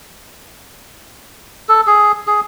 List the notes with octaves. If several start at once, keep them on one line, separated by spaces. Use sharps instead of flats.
A4
G#4
G#4